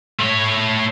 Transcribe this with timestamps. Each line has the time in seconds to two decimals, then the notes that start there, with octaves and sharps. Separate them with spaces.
0.19 A3 C#5